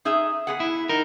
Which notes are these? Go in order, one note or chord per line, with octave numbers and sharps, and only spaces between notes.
D#4 G#4 E5
B3 G#4 F#5
E4
D#4 A#4